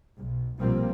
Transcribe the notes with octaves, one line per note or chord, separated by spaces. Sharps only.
B1
B1 A#2 F3 G3 A#3 C4